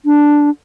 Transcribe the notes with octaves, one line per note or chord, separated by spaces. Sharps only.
D4